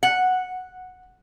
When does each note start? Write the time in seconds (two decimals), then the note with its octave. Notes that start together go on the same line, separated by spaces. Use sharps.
0.03 F#5